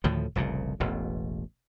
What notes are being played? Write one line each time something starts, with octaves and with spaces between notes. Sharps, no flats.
D2 A2 D#3 F3
F1 C2 A#2 C#3
E1 A1 B2